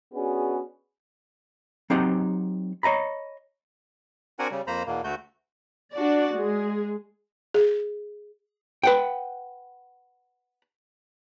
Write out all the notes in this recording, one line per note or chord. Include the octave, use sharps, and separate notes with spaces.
B3 C#4 D4 F#4 G#4
F#3 C4 D#4 G4 F#5
C#5 D#5 A#5 B5
C4 D4 F#4 A#4 F#5 G#5
C#3 G3
F2 A#3 C5 A#5 B5
E2 B2 A#3
D2 A3 F#4 G6
D4 F#4 D5
G#3 G#4
G#4
B4 F#5 G5